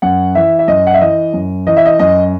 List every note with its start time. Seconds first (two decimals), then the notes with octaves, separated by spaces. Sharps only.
0.02 F#2 F#5
0.35 E3 E5
0.59 E5
0.68 F#2 D#5
0.87 F#5
0.94 E5
1.01 E3 D#5
1.33 F#2
1.67 E3 D#5
1.77 E5
1.85 D#5
1.99 F#2 D#5